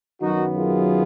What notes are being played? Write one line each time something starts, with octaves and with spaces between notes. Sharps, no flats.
F#2 D#3 F#3 B3 D#4 F#4
F4 G#4